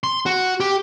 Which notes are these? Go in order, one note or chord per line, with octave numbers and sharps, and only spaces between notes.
C6
F#4
G4